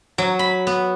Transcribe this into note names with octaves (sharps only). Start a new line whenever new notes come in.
F#3
B5
B3